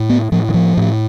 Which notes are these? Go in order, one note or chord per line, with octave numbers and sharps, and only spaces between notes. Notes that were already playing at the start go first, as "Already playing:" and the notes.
Already playing: A2
B3
A2 F3
E3
F3
A2